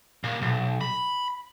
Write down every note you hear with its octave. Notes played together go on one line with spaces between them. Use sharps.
A#2
B1
B5